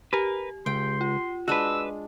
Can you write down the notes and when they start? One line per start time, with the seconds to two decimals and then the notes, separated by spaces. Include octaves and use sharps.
0.13 G4 A#4 B4
0.66 C#2 G5 C6
1.01 F4
1.48 G#3 D4 F#4 B4 E6